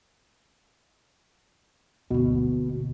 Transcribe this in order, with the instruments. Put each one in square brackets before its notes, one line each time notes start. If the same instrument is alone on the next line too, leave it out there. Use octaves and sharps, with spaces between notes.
[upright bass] F#1 D2 [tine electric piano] B2